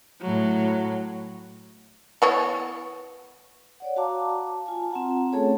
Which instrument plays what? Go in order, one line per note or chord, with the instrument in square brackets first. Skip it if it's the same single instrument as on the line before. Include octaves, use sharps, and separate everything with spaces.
[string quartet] A2 F#3
[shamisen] E3 B3 C#5
[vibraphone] C#5 D5 F#5
F#4 F5 A5 A#5 D6
F4 G#5 A5
C4 F4 F#5 A#5
A3 C#4 G#4 A4 C#5 A5